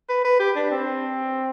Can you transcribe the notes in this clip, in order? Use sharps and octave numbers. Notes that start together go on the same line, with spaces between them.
B4
B4
G4
D4
C4